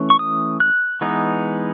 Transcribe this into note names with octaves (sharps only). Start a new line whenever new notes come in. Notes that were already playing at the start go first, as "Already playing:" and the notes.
Already playing: E3 A3 C#4
C#6
D#6
F#6
E3 G#3 B3 D#4